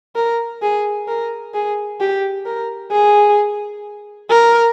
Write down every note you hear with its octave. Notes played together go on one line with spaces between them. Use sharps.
A#4
G#4
A#4
G#4
G4
A#4
G#4
A#4